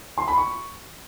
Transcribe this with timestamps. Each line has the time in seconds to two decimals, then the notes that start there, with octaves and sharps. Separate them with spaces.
0.18 C6
0.28 B5
0.38 C#6